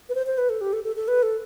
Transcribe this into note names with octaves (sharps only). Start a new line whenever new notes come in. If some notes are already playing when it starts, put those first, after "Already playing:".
B4
C5
C5
B4
A4
G4
A4
A4
A4
B4
A4